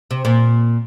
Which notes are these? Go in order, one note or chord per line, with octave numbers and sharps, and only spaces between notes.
C3
A#2